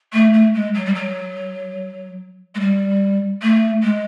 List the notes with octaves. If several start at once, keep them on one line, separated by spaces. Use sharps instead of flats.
A3
A3
G#3
F#3
G3
F#3
G#3
G3
A3
G#3